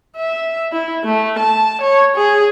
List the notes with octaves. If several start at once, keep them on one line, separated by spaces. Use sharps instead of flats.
E5
E4
A3
A5
C#5
G#4